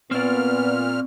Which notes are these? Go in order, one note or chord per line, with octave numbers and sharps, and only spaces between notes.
A#2 B3 C4 D5 F6